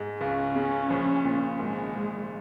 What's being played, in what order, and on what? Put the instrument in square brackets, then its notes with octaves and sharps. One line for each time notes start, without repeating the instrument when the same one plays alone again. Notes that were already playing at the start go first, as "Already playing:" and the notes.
Already playing: [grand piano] G#2
[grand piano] C#2 [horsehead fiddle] C#4
[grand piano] C#3
A#1
A#2
[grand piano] G#1 [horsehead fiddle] G#3
[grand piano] G#2